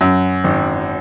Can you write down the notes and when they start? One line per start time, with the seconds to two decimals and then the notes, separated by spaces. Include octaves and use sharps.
0.01 F#2
0.44 G#1